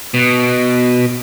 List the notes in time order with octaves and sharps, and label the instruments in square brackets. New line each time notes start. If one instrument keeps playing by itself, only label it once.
[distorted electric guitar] B2